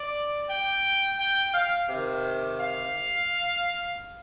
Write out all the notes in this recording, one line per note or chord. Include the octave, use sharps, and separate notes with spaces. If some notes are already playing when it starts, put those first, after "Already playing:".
Already playing: D5
G5
G5
F5
C3 D#3
F5